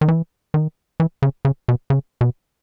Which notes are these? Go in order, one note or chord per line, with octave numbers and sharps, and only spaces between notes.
D#3
E3
D#3
E3
C#3
C#3
B2
C#3
B2